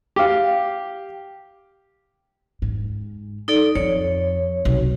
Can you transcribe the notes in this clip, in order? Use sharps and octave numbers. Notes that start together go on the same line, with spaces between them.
G4 F5
G#2
D#4 A4 D5
F2 C#5
B1 C3